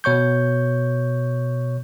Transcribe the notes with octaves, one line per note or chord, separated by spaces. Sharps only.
B2 C#5 C#6 G6